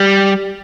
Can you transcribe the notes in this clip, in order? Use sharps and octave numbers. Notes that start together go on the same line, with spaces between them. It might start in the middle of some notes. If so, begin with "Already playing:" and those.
Already playing: G3